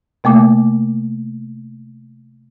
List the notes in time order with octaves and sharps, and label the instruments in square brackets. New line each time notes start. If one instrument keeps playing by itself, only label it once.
[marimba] C3 A3 A#3 D6